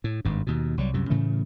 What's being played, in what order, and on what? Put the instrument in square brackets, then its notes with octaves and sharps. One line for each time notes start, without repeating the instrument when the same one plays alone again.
[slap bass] A2
G#1 G2
D#2 B2
C2 F#3 G3
C2 F#2 C3
A2 C#3 E3 A3